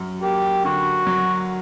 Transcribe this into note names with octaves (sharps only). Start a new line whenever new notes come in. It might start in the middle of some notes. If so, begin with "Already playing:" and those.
Already playing: F#2
A#3 G4
D3 F#4
F#3